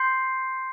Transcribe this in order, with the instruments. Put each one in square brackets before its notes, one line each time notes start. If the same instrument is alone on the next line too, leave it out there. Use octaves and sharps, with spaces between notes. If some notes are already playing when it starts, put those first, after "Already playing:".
Already playing: [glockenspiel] C6 G6 C7